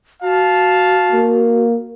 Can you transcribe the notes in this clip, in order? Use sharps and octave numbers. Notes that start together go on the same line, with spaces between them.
F#4 F5 A5
A#3